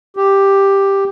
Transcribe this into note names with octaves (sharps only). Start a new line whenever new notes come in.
G4